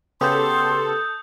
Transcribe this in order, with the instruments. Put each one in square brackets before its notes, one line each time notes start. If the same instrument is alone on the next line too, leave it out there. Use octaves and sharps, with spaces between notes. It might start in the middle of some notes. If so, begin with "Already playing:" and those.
[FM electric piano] C#3 B3 G4 [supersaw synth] A4 [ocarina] C6 [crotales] D#6 G6